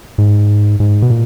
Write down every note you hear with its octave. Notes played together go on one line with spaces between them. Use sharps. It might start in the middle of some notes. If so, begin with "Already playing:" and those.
G#2
G#2
B2
A#2